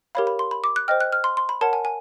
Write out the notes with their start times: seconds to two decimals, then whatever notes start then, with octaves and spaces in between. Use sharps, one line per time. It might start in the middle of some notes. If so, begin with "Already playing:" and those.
0.15 G4 A#4 C#5 F5 B5
0.27 B5
0.39 C6
0.51 B5
0.64 D6
0.76 F#6
0.88 C5 D#5 G5 F6
1.01 F#6
1.12 F6
1.24 C6
1.37 C6
1.49 B5
1.61 A#4 C#5 F#5 A5
1.73 G#5
1.85 G#5